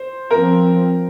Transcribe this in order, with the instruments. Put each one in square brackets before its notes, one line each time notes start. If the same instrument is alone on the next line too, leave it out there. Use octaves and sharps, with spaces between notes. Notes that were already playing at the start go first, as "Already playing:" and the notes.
Already playing: [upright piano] C5
[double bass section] F3 C4 [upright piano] A#4